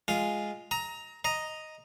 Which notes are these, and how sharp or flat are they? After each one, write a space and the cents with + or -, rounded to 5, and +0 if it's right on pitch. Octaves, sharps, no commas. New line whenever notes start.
G#3 +0 F4 +0
A#5 +0 D#6 +40
D#5 +0 A#5 +0